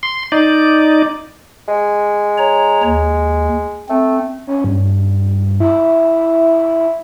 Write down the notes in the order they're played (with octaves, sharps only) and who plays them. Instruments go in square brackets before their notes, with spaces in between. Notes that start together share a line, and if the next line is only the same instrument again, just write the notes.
[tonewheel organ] C6
D#4 D5
[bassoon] G#3
[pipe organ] C#5 A#5
D#2
[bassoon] A3 [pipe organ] C4
[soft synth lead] C#4
G2
E4